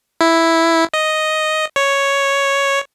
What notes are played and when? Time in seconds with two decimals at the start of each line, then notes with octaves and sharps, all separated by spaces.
0.21 E4
0.94 D#5
1.76 C#5